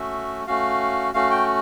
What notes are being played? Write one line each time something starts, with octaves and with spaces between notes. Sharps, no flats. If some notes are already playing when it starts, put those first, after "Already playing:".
Already playing: A3 C#4 F#4 E5
A3 C#4 F#4 F5
A3 C#4 F#4 F5
G5